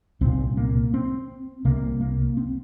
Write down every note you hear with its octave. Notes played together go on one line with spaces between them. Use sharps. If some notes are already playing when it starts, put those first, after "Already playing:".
C2 A#2 C4
A#3
C4
C2 C3 A#3
A#3
C4